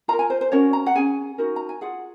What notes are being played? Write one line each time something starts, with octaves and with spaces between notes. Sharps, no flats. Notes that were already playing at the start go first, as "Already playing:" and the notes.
F4 A#4 A#5
G#5
C5
C5
C#4 F#4 A#4 C#5
A#5
F#5
C#4 G#4 G#5
D#4 F#4 A#4
A#5
G#5
F4 G#4 F#5